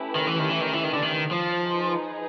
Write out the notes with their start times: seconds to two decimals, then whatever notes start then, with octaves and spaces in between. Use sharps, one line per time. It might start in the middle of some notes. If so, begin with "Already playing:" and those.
Already playing: A3 C#4 E4 G4 B4
0.15 D#3
0.27 E3
0.39 D#3
0.50 E3
0.61 D#3
0.73 E3
0.83 D#3
0.94 D3
1.02 D#3
1.31 F3
1.60 D#4 G#4 B4